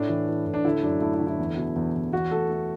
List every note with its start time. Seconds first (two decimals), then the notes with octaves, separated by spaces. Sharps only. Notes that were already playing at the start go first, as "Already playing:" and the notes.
Already playing: A2 D4
0.09 E3
0.28 E3
0.46 A2
0.54 D4
0.65 D3 E4
0.83 F#2 D4
1.01 A3 E4
1.14 E4
1.20 D3
1.27 E4
1.38 E2
1.57 B2
1.76 E2
1.95 E2
2.12 E2 F#4
2.31 A3 A4
2.50 A3